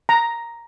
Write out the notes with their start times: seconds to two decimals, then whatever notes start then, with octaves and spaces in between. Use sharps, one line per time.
0.09 A#5